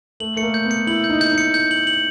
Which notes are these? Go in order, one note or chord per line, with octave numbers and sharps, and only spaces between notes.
A3 F#7
A3 C#7
A#3
G6
B3
C#7
E4 F#7
G6
D#4
G6
D#4
C#7
G6
F#7
F#7